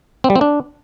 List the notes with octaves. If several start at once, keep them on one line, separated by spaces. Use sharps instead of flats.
C4
G3
C4
D4